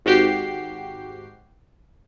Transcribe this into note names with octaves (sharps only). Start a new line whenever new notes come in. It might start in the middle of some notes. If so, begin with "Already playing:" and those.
G#1 G#2 F#4 G4 G5 C7